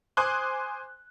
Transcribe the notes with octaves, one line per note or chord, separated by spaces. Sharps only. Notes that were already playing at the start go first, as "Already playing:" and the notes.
C5 G#5 C6 D6 D#6 F#6